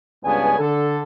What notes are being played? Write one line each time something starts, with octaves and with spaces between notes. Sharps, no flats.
C#2 G2 C#3 B3 D4 G#5
D3 A4